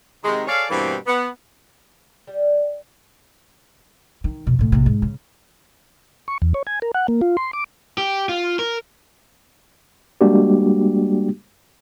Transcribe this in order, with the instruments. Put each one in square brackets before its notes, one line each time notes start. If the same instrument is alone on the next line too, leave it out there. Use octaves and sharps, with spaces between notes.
[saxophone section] C3 D#3 G#3
G#4 A4 C#5 D5 F5
G2 B2 E3 G3 A#3 C4
B3
[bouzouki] G3
[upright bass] D#3
F2 B2
A2 C3
A#1 C3
G#2
C#3
[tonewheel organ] C#6
E2
C#5
G#5
A#4
F#5
A#3
F4
C6
D6
[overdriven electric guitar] G4
F4
A#4
[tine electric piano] G3 G#3 A#3 D4 F#4 G4